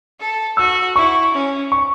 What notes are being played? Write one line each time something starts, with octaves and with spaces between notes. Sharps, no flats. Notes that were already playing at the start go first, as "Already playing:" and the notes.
A4
F#4 E6
E4 C#6
C#4
C#6